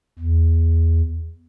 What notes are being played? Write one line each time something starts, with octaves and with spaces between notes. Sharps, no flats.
E2